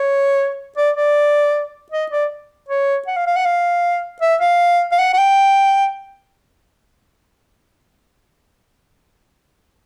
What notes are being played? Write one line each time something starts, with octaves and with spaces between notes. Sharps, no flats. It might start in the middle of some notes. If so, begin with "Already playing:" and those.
Already playing: C#5
D5
D5
D#5
D5
C#5
F#5
F5
F5
F#5
F5
E5
F5
F5
F#5
F#5
G5